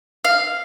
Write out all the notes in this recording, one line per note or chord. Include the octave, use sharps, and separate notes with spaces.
F5